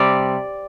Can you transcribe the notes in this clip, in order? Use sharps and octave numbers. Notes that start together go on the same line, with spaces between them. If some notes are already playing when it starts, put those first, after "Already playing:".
Already playing: C3 G3 C4 D5